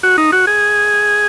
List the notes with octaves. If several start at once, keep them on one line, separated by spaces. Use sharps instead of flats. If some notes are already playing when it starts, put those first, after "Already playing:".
F#4
D#4
F#4
G#4